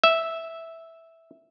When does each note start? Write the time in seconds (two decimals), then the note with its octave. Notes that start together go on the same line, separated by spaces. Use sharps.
0.04 E5